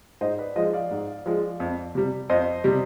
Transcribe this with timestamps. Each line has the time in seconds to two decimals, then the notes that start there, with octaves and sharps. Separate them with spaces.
0.21 G#2 C5 D#5
0.38 B4 D5
0.56 F3 G#3 C5 D#5
0.73 D5 F5
0.91 G#2
1.26 F3 G#3
1.60 F2
1.95 C3 G3
2.30 F2 C5 D#5
2.64 C3 G3